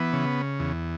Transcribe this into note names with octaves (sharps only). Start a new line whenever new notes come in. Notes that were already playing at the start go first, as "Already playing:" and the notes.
Already playing: E3 B3
C#3
E2